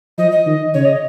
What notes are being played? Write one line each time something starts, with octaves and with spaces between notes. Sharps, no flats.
F3 D#5
D#5
D#3
C#3 C#5
D#5